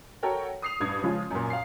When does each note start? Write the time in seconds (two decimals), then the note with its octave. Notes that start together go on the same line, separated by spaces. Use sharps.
0.23 F#4 A4 A#4 C#5 G5
0.62 D#6 C7 F7
0.80 A1 G2 D#6 G#6
1.02 C#3 F3 G#3 C#4 F4
1.31 F#2 A#2
1.50 F5 C7